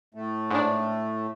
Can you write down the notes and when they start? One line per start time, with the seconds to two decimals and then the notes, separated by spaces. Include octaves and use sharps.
0.14 A2 A3
0.50 G#2 D4